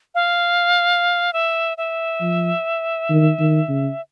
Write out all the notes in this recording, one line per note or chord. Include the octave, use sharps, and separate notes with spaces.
F5
E5
E5
F3
D#3
D#3
C#3